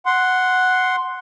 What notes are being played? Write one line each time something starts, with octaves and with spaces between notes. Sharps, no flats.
F#5 C6